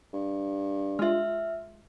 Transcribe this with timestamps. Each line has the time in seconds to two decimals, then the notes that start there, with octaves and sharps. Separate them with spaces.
0.13 G2
0.99 G#3 F4 E5 F6